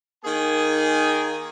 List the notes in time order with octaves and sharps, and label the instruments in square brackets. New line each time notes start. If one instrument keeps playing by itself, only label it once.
[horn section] D#3 A#3 G#4 G#5